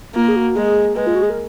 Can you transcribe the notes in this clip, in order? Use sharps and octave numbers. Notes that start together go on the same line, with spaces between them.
A#3 F4
G#4
F#4
G#3 G#4
G#3 B4
F4
F#4
G#4
A#4